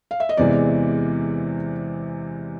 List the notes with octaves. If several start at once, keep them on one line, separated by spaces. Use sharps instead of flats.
F5
E5
D#5
E2 C3 E3 G#3 D5